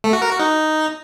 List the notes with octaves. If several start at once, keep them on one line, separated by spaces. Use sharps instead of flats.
A3
F#4
A#4
F#4
D#4